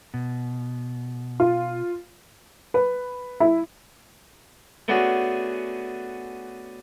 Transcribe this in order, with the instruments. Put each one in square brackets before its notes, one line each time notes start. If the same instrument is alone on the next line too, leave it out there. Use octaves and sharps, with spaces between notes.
[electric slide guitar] B2
[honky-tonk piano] F4
[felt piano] B4
E4
[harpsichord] A3 B3 C#4 D4 F#4 G#4